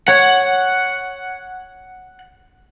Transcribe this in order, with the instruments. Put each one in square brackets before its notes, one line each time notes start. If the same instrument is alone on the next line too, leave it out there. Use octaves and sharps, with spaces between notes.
[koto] C#5 [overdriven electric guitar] F#5